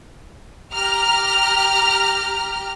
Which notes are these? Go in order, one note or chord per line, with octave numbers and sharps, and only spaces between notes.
G4 A#5 F6